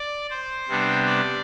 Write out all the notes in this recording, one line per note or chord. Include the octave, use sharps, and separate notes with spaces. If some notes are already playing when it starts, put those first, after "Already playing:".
Already playing: D5
C5
C3 G3 B3 D4
D5